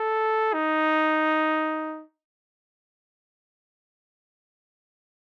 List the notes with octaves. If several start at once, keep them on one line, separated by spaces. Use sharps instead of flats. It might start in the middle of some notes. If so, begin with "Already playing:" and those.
Already playing: A4
D#4